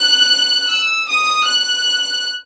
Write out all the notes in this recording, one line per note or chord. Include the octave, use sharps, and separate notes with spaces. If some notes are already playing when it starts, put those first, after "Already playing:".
Already playing: F#6
E6
D#6
F#6